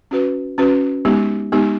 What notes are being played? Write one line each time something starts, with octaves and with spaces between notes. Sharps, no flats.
C#4 F#4 B4
C#4 F#4 B4
G#3 B3 D#4 G4
G#3 B3 D#4 G4